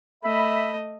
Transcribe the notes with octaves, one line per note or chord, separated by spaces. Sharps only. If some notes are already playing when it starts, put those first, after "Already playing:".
A3 D#5 E5 B5